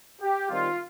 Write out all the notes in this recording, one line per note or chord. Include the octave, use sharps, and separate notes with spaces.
G4
D#3 G3 C4 D#4 F4